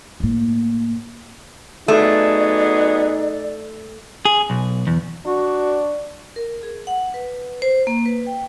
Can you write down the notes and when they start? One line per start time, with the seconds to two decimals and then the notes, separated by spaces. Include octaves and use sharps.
0.20 A2 A#3
1.88 F#3 A3 B3 D#4 G#4 D5
4.25 G#4
4.50 B1
4.87 E2
5.26 D4 F#4
6.36 A#4
6.63 G#4
6.87 F#5
7.14 B4
7.62 C5
7.87 A#3
8.06 B4
8.26 G5